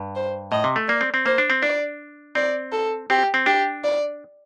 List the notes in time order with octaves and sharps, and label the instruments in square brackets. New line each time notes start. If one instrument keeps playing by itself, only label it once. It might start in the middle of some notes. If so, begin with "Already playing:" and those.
Already playing: [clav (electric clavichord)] G2
[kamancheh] C5
[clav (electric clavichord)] A2 [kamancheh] D#5
[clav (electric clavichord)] C3
A3
[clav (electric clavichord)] A#3 [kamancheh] D5
[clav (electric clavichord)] C4
C4
[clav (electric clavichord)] A#3 [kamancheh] C5
[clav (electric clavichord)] D4
C4
[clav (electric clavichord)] D4 [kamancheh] D5
[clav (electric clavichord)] C4 [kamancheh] D5
[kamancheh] A4
[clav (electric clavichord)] C4 [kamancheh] G4
[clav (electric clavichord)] C4
[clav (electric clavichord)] D4 [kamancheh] G4
[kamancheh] D5